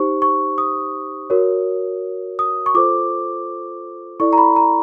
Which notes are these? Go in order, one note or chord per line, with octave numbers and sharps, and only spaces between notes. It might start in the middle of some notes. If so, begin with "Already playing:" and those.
Already playing: D#4 G4 C5 C#6
C#6
D#6
F#4 A#4 C#5
D#6
C#6
F4 A4 C5 D6
E4 A4 D5 C#6
A#5
B5
A#5